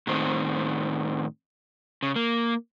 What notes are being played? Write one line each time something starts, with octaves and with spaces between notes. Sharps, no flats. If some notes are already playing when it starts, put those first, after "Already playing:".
A2 D#3 C4
C#3
A#3